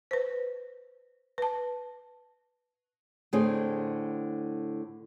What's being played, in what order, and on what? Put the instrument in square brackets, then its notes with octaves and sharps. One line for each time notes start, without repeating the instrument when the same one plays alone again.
[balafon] B4 C5
B4 A5
[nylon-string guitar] A2 D3 C4 G#4